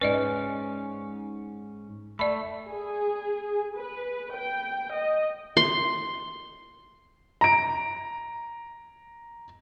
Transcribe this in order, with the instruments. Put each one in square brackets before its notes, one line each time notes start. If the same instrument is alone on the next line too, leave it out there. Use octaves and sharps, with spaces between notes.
[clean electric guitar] G#2 C#4 [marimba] B4 D5 D#5
[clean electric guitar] A3 [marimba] D5 B5
[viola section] G#4
B4
G5
D#5
[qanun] C6
[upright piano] A#5 D7